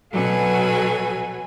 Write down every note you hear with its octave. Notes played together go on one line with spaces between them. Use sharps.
B2 F#3 F#4 A4 B4 G#5